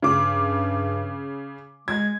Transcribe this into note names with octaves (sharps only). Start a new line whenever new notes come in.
G2 C#3 D6
G#3 G#6